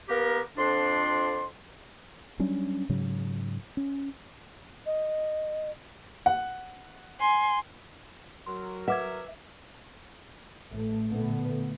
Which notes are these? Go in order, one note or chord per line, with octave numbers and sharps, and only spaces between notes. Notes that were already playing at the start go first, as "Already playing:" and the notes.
A#3 B3 G4 A#4
F2 D4 C6
F#3 G3 C#4 D4
G#2 C#3 F#3
C#4
D#5
F#5
G#5 C6
F#3 A#4 C6
B4 E5 F#5 D6 G#6
A1 A3
A#2 D3 A3 B3